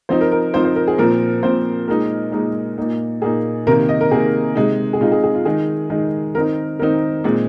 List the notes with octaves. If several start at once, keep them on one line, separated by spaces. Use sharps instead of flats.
F3 C4 D#4 C5
A#4
A#4
F3 C4 D#4 C5
C5
A#4
G#4
A#2 F3 C4 A#4
A#2 F3 C4 C5
A#2 G#3 D#4 A#4
A#2 G#3 D#4
A#2 A#3 D#4
A#2 A#3 D#4 G#4
C3 D#3 A#3 A#4
D#5
A#4
C3 D#3 A#3 G#4
C3 G#3 D#4
G#4
C3 G#3 D#4 F4
G#4
G#4
F4
D#3 G#3 D#4 G#4
D#3 G#3 D#4
D#3 C4 D#4 A#4
D#3 C4 D#4 A#4
A#2 G#3 C4